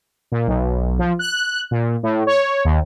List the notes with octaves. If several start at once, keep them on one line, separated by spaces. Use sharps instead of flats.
A#2
B1
F3
F#6
A#2
A2
C#5
D#2